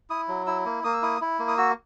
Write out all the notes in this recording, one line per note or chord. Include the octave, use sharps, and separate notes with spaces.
E4 D#6
F#3
E4 E6
A#3
A#3 D#6
E6
E4 D#6
E4
A#3
D#6
F#4 E6